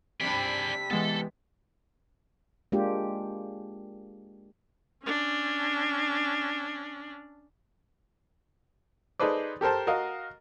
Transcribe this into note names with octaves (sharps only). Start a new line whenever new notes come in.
C3 G3 D4 G#4 D5 B6
E3 G#3 B3 A4 A5
G#3 A#3 D4 F4 G4
C#4 D4
D#4 G#4 A4 B4 C5 D5
G4 A4 A#4 C5 A5
F#4 A#4 D#5 F5